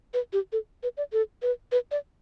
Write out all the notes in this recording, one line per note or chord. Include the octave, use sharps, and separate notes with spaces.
B4
G4
A4
B4
D5
A4
B4
B4
D5